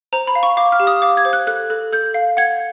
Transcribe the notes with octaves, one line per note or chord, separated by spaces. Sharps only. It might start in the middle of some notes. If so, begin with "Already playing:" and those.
C5 A#5
B5
F5
C#6
F5 D6
F6
G4
D#6
F5 D6
G#6
C5
F#6
A4 F#6
A4
A4 G6
F5
F#5 G#6